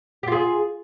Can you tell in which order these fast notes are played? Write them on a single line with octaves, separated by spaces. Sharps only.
G4 F4 G#4